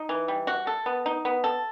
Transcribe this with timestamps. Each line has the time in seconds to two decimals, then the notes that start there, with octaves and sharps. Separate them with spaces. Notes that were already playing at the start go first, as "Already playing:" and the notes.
Already playing: D#4
0.09 E3
0.28 G3
0.47 F#4
0.67 A4
0.86 B3
1.06 D#4
1.25 B3
1.44 A4